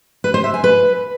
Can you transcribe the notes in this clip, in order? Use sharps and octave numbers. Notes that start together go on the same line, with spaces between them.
B4
C5
E5
G#5
B4